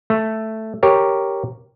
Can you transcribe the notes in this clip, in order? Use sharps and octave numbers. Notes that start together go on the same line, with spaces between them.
A3
G4 A#4 C#5